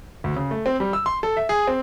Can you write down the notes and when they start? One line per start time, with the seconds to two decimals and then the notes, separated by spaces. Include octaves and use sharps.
0.24 D2
0.36 C#3
0.51 A3
0.66 C4
0.80 G3
0.93 E6
1.06 C6
1.23 A4
1.37 E5
1.49 G#4
1.68 C4